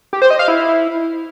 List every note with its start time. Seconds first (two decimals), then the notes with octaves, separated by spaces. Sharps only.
0.13 G4
0.22 C5
0.30 D#5
0.39 F5
0.48 E4